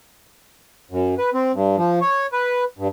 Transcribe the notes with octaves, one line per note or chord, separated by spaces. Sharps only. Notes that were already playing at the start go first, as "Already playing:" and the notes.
F#2
B4
C4
G2
F3
C#5
B4
G2